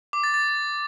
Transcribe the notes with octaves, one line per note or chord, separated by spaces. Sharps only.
D6
A6
A6